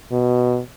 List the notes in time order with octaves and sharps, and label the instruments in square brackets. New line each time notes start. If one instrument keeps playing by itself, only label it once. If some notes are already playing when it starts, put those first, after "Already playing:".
[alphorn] B2